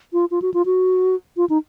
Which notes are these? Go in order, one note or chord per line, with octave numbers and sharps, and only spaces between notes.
F4
F4
F#4
F4
F#4
F4
D#4